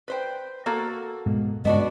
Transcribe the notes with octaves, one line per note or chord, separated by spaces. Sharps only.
B4 C5 G5
A#3 F#4 A4
G#2 B2 G#3
G2 C#3 G#3 B3 D4 F#4 D#5